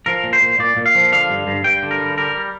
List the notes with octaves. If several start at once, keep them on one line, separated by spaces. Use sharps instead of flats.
F3 A#4
A#2
C5
A#2
A#2 D5
A#2
F5
F3
D3 F5
G2
G2
G2 G5
D3
A#4
G3
G3 A#4
G3